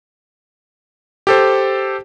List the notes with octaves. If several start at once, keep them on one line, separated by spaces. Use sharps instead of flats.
G4 A4 C5